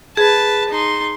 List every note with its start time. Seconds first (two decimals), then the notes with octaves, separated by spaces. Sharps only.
0.17 G#4 B4 A5
0.69 D#4 C6